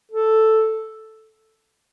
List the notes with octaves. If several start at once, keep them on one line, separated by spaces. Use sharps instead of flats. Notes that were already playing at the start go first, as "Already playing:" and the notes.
A4